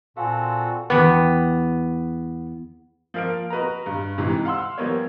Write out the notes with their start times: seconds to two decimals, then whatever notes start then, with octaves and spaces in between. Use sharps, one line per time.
0.17 A#2 C4 F#4 A4 F5 G#5
0.90 E2 B3 G4
3.14 F3 A#3 F5 F6 D7
3.50 F#4 B4 D#5 A#5
3.86 G2
4.18 G#2 C3 E3
4.45 F5 F#5 C6 E6
4.78 F3 G3 A#3 B3 C#5